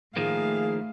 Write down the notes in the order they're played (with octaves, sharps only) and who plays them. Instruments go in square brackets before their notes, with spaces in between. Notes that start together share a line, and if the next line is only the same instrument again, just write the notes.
[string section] A2 [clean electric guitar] D#3 F3 A#3 [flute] G#4 [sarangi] F5